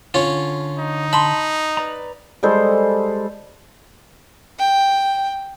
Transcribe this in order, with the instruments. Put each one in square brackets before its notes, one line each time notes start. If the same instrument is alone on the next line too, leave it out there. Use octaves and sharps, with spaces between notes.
[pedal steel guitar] D3 [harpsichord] C#4 F4
[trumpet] D#4
[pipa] A5 C6 [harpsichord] B5
[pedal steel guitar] B4 D5 A#5
[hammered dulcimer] G3 G#3 A4 C5
[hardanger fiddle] G5